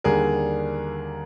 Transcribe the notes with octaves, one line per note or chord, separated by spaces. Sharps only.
D#2 D3 G3 G#4 A#4